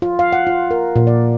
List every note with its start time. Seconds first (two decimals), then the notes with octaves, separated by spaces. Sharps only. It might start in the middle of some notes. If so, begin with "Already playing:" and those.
0.02 F4
0.19 F5
0.33 F#5
0.47 F4
0.71 A#4
0.96 A#2
1.07 D5